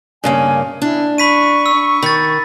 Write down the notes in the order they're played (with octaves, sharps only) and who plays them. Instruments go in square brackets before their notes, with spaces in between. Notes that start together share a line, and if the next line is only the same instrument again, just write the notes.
[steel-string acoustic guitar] G2 C#3 A#3 [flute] G#5
[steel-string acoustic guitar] D4 [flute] E4
[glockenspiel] B5 B6 D#7 [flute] C#6
[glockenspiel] E6
[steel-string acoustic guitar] D#3 [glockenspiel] B5 A6